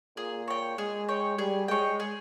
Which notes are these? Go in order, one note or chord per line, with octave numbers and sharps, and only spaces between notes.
A#2 G#4
C#5 G5
G#3 G#4
C#5 G5
G3 G#4
G#3 C#5 G5
G#4